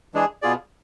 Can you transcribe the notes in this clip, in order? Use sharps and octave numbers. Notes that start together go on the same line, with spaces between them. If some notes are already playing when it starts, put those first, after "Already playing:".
E3 G#3 D4 G#4
B2 B3 F4 G#4 D5